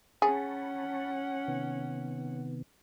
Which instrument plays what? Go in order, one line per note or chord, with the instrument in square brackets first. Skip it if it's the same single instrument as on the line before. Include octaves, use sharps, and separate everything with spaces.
[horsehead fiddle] C#4 F#5 [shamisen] G#4 [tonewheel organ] A5 B5 C#6
[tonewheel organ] C3 D#3 B3